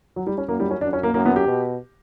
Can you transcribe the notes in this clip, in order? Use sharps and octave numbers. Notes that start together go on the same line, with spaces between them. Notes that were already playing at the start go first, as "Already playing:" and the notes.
F#3
G3
C#4
F#2 A#3
G3
C#4
F#2 D4
C#4
A#3
F#2 A#3
B3
G4
B2